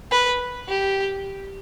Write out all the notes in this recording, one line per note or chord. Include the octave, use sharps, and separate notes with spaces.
B4
G4